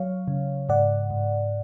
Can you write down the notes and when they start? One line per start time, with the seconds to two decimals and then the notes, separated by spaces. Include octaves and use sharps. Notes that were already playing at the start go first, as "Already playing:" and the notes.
Already playing: F#3 C#5 F5
0.28 C#3
0.69 G#2 D5 F#5
1.10 G#2